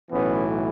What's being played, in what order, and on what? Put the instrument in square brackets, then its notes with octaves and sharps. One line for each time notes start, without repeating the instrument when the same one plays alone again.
[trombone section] B1 A2 E3 B3 C#4